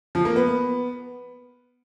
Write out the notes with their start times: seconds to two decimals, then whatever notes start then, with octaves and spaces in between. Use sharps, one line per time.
0.15 F3
0.25 A#3
0.36 B3